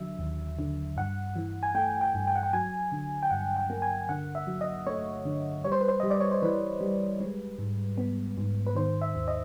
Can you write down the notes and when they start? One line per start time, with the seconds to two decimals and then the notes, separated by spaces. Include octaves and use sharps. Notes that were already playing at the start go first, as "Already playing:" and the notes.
Already playing: D3 F#3 E5
0.19 D#2
0.59 D3
0.97 G2 F#5
1.36 E3
1.63 G#5
1.75 A3 G5
2.01 G5
2.14 G2
2.27 G5
2.35 F#5
2.43 G5
2.53 F#3 G#5
2.92 D3
3.23 G5
3.31 G2 F#5
3.56 G5
3.70 A#3
3.82 G#5
4.09 D3 F#5
4.35 E5
4.47 F#3
4.61 D#5
4.86 A3 C#5
5.25 D3
5.65 G3 C#5
5.72 C5
5.81 B4
5.88 C5
6.00 G3 D#5
6.10 D5
6.21 C#5
6.31 C5
6.42 E3 B4
6.81 G3
7.20 G#3
7.58 G#2
7.98 B3
8.38 G#2
8.67 B4
8.75 D#3 C5
9.02 E5
9.15 D#2
9.28 D#5